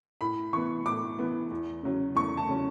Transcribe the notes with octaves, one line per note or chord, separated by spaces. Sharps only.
A2 B5
E3 B3 C#6
A2 D6
E3 B3
E2
C#3 F#3 C#4
E2 C#6
A5
C#3 F#3 C#4